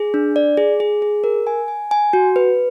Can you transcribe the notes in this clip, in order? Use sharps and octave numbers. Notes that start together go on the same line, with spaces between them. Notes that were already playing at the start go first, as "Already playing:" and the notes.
Already playing: G#4
D4
D5
G#4
G#4
G#4
A#4
G#5
G#5
G#5
F#4
B4